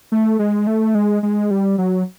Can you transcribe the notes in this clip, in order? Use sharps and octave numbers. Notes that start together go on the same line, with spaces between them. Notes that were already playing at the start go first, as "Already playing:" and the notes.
A3
G#3
A3
G#3
G#3
G3
F#3